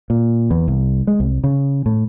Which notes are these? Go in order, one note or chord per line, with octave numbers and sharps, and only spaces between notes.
A#2
E2
C2
G#3
C2
C#3
A2